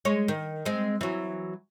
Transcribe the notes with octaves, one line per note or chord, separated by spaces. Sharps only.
G#3 C#5
D#3
G#3 C4
E3 F#3